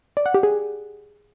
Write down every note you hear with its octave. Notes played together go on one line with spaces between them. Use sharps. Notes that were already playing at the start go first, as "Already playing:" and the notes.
D5
F#5
G4
G#4